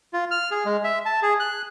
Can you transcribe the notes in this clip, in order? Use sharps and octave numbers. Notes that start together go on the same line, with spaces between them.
F4
F6
G#4
G#3
E5
A5
G#4
F#6